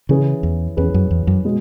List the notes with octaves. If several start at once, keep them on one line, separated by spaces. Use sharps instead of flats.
C#3 E3 C#4 G#4 B4
E2
E2 E3 C#4 G#4 B4
F#2
E2
F#2
B2 G#3